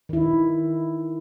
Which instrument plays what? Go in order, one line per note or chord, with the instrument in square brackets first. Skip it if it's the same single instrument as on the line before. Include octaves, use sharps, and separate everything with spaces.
[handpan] D#3 E4